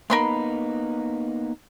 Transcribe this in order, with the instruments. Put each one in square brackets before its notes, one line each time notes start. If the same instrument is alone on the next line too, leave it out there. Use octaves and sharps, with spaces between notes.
[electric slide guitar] A#3 B3 D#4 [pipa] A#4 B5 C6